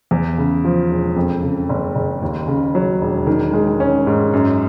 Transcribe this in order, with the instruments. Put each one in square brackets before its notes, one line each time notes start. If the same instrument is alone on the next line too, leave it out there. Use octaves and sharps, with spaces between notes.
[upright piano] E2
C#3
F3
E1
F2
C#3
F#1
F#1
D#2
C#3
F#3
E1
D#3
G#3
C#4
G#2
F#2